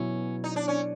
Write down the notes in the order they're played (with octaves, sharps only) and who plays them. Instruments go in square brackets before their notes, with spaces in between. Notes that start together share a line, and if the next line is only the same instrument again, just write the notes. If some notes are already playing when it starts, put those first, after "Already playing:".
Already playing: [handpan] B2 F#3 B3 E4 [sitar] C#4
[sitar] D#4
D4
C#4